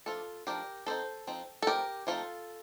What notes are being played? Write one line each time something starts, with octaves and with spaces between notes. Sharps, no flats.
F3 A3 D4 F4 A4
F3 A3 D4 G4 A#4
F3 C4 D#4 A4 C5
F3 C4 D#4
A4
F3 A3 C4 D#4 G4 A#4
F3 A3 C4 D#4 F4 A4